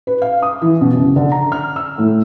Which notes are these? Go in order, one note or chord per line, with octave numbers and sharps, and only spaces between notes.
B4
F5
D#6
E3
B2
F#1
D3
A#5
F6
E6
A2